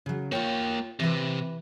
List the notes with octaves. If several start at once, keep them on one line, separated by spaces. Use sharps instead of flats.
C#3 F#3
A#3 F4 C#5 G5
C3 E3 B4